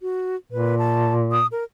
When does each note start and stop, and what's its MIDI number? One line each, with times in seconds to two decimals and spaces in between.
0.02 0.36 66
0.52 1.47 46
0.52 0.78 71
0.79 1.14 81
1.32 1.47 87
1.52 1.64 70